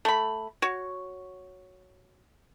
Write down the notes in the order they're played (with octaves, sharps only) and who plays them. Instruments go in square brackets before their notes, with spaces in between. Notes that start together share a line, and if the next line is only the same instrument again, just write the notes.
[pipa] A3 B5
F#4 C#5